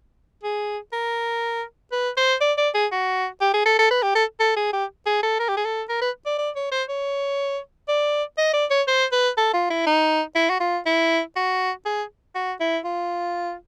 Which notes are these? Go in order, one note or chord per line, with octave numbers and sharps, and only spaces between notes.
G#4
A#4
B4
C5
D5
D5
G#4
F#4
G4
G#4
A4
A4
B4
G4
A4
A4
G#4
G4
G#4
A4
A#4
G4
G#4
A4
A#4
B4
D5
D5
C#5
C5
C#5
D5
D#5
D5
C#5
C5
B4
A4
F4
E4
D#4
E4
F#4
F4
E4
F#4
G#4
F#4
E4
F4